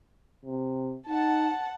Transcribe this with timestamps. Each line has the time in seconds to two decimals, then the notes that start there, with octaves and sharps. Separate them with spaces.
0.45 C3
1.09 D#4 F#5 A5